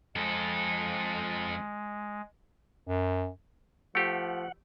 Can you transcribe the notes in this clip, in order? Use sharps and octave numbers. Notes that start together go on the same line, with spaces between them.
F2 G#3 A4
F#2
F3 A3 G4 F#5